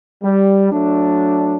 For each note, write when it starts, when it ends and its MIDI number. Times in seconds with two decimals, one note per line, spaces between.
0.24 0.71 55
0.72 1.57 54
0.72 1.57 57
0.72 1.57 62